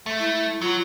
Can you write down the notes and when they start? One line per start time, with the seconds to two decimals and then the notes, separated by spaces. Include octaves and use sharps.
0.06 A3
0.19 E4
0.61 F#3 F4